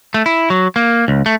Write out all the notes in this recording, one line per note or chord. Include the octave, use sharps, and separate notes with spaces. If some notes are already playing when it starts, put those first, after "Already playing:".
A3
E4
F#3
A#3
C#2
A3